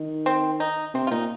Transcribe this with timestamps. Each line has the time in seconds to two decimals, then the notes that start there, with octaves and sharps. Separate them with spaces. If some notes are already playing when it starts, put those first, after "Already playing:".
Already playing: D#3
0.26 C4
0.60 D#4
0.94 C3 C4
1.07 F4
1.11 A#2 D#4